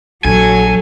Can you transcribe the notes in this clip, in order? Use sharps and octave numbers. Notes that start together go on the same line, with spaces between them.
A#1 F#3 A4 G#5